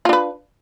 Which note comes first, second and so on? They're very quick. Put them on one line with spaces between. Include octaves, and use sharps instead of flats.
F4 D4 B4